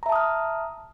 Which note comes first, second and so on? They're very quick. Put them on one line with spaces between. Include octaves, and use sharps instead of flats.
A#5 E5 A5 D#6 F6